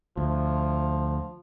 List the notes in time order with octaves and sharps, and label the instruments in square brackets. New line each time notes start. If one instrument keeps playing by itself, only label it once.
[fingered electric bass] D2 [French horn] F3